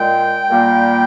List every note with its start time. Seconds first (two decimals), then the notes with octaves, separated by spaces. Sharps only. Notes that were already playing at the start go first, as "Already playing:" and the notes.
Already playing: A#2 G#3 G5
0.50 A#2 G3 A#3